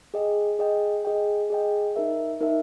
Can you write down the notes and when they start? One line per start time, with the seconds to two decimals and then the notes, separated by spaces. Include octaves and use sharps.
0.14 G#4 D#5 G5
0.59 G#4 D#5 G5
1.05 G#4 D#5 G5
1.50 G#4 D#5 G5
1.96 D#4 A#4 E5
2.41 D#4 A#4 E5